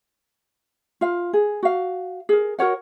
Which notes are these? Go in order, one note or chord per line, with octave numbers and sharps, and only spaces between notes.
F4 F5
G#4
F#4 F5
G#4 A#4
F#4 A#4 C#5 F#5